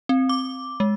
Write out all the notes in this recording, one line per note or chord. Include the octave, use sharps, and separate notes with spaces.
C4
D6
G#3